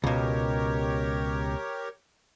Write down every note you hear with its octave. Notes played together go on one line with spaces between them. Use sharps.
C#2 B2 G4 A#4 C#5